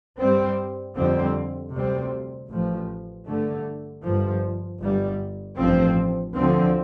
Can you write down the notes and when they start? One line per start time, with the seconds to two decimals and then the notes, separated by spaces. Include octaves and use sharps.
0.18 G2 G3 C4
0.95 F2 D3 G3 C4
1.73 D2 C3 G3 C4
2.49 A1 A2 F3
3.27 G2 D3 A3
4.04 G1 G2 F3
4.80 G1 G2 G3
5.57 A1 G2 F3 C4
6.35 D2 D3 F3 C4